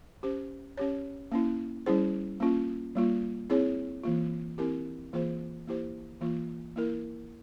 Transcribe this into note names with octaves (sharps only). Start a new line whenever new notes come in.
C#4 G4 C5
C#4 G4 C#5
A#3 C#4 E4
G3 C#4 E4 G#4 C5
A#3 C#4 F4
G3 A#3 F4
C4 E4 G#4 C#5
E3 A#3 F4
C4 E4 G4 A#4
E3 A#3 F4 G#4 C5
A#3 E4 G4 C5
E3 A#3 F4
A#3 E4 A#4